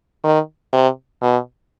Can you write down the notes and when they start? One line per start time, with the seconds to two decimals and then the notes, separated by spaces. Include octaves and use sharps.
0.24 D#3
0.73 C3
1.22 B2